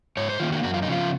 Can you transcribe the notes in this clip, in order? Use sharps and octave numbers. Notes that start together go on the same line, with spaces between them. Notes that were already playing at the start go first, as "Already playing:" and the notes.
G#2 C#5
C5
D#3 A#3 F4
F#4
F#2 F#4
F4
D#4
C#3 F3 F4